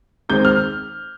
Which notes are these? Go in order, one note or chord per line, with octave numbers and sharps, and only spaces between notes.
D#3 G#3 C4 G6
F6